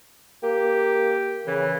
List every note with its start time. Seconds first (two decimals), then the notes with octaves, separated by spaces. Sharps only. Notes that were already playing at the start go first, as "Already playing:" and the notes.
0.43 A#3 G4
1.47 C#3 E3